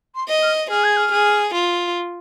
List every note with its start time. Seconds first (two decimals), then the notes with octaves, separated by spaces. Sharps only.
0.15 C6
0.28 D#5
0.42 F6
0.70 G#4 F6
0.84 G#6
0.96 F6
1.12 G#4
1.54 F4